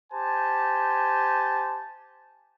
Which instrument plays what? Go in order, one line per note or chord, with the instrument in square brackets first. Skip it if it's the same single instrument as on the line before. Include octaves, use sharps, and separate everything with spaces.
[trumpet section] G4 C5 G#5 A5